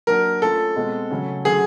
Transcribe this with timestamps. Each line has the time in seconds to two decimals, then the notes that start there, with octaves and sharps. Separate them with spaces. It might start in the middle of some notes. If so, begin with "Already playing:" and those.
0.07 F#3 A#3 D4 A#4
0.42 A3 C#4 F4 A4
0.76 B2 G#3 C4
1.10 C#3 F#3 A3 C#4
1.45 D3 F#3 A3 C#4 G#4